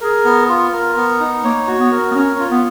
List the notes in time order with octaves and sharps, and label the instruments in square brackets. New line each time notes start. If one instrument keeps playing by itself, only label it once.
[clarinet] G#4 [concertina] A#4
[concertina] B3
F4
A#4
B3
D#4
[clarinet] A#3 [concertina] C#5
[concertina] F#4
[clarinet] B3
[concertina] A#4
[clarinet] B3
[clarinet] C#4 [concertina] C#5
[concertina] F4
[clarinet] B3